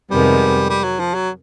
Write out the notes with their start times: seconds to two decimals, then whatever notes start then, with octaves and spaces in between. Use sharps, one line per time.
0.10 F2 C3 D#3 G3 G#3 B3
0.69 G3
0.83 F#3
0.99 F3
1.14 F#3